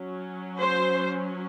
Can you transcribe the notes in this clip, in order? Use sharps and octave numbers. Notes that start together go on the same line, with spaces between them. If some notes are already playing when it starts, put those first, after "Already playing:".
Already playing: F#3 C#4
C5